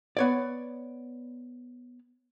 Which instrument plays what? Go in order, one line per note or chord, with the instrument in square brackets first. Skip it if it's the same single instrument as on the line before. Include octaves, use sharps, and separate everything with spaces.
[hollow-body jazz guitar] B3 C#5 D5